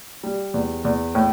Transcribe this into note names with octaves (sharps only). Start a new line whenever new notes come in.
G3
E2
E2
A2